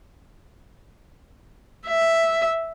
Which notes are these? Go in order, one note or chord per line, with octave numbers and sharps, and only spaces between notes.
E5